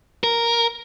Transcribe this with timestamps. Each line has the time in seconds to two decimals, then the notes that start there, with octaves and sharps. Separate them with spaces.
0.24 A#4